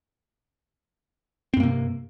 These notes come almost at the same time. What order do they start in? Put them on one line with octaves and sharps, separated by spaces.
C4 G2 A#3 C3